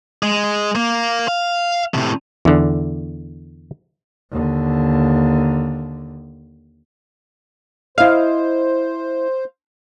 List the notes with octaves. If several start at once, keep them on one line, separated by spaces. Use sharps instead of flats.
G#3
A#3
F5
A2 C3
E2 D3
D#2 D3
E4 C5 D#5 F5